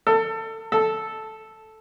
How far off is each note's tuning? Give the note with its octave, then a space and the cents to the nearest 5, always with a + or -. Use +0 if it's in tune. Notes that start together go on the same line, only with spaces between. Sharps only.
A4 +25
A4 -5